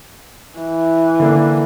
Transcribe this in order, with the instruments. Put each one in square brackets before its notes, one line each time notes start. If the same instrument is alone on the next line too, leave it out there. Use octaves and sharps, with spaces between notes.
[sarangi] E3
[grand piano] D3 A#3 D4